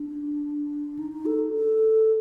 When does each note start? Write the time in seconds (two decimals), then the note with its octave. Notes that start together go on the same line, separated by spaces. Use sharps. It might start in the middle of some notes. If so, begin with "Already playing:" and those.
Already playing: D4
0.99 D#4
1.12 D#4
1.26 A4
1.53 A4